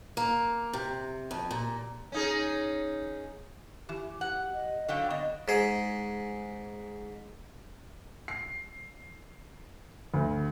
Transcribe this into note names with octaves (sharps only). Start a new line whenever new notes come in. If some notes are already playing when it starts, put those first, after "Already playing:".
A#3
C3
F2
A#2
C#4 D#4 G#4
E3 G4
F#5
D#5
D3 F#3 F5 G5
B3 D#5
G#2 G#4
C7
D2